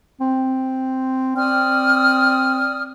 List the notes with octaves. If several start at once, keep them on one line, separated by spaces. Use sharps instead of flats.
C4
C4 D5 D#6 F6